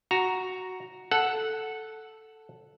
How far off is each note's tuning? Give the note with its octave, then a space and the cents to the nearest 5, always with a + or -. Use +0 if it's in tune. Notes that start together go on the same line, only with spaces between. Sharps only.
F#4 +0 A#5 +0
A4 +0 F#5 +0